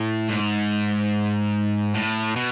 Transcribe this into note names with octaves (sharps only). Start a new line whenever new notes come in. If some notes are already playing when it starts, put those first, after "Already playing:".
Already playing: A2
G#2
A2
B2